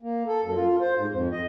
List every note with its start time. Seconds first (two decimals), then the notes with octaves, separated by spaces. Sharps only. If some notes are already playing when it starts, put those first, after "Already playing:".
0.02 A#3
0.27 A4
0.43 F#2
0.55 F4
0.81 C5
0.97 G#2
1.12 F2
1.32 D#5